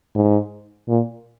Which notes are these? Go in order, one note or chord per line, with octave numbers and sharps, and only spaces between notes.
G#2
A#2